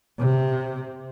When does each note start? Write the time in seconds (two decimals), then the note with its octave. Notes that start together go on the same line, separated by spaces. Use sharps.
0.20 C3